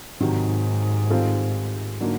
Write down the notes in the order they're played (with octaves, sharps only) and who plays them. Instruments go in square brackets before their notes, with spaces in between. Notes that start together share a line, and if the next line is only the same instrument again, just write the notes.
[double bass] G#2 [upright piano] C3 D#3 F#3
[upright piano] D#3 G3 C4 F4 A4
D3 F#3 A#3 D#4